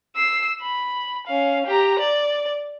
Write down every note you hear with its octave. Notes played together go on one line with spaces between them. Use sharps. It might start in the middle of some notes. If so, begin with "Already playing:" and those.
E6 C7
B5
C#4 F5
G4 A#5
D5